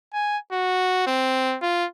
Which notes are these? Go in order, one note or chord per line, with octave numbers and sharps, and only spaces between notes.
G#5
F#4
C4
F4